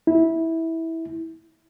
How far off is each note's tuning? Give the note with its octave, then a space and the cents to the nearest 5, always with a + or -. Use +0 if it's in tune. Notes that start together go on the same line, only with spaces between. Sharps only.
E4 -15